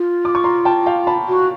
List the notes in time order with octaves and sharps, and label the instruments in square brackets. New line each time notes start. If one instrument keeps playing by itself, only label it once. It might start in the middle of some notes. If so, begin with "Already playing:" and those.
Already playing: [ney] F4
[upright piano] D6
C#6
A#5 C6
G5 A5
F5 G5
A5 B5
[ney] F#4